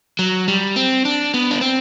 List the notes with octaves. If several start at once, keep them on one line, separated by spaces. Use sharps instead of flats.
F#3
G3
C4
D4
B3
D4
C4